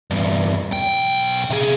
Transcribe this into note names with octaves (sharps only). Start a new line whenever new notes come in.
E2 G2
B1 G5
C3 G#4